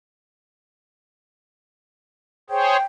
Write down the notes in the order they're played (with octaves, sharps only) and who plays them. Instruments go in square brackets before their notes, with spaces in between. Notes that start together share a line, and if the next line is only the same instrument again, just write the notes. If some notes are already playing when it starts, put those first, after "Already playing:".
[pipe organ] G#4 C5 C#5 [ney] G5